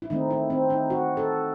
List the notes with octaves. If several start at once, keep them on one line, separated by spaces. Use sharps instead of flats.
E4
D#3 A3 C4 D#4
E4
C4
D#4
F#4
A4